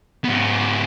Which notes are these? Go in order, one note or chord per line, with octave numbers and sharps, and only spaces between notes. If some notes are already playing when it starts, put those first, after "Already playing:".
G#2 B3